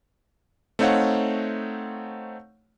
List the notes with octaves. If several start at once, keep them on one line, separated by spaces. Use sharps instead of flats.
A3 C4 D#4 C#5 F5 F#5